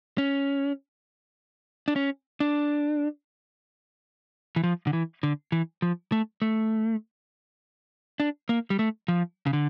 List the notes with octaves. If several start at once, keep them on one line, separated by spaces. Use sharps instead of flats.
C#4
D4
C#4
D4
E3
F3
D3
E3
D3
E3
F3
A3
A3
D4
A#3
G3
A3
F3
C#3
D3